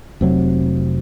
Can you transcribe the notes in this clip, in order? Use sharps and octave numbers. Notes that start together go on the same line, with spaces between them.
F1 C3 F#3